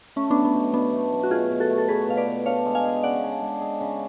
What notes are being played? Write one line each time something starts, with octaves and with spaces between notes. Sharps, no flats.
A3 C#4
F#3 B3 D4
B3
B2
B2 B3 D4
A3
F#3
F#4
B2 F4 G#4
B2
F#4 A4
A3
A4
F#3 G#4 B4
B2 F5
B4 D5
B2
D4 C#5 F5
G#3
F5 G#5
G#4
C#3 D5 F#5
D4
G#3
G#4
C#3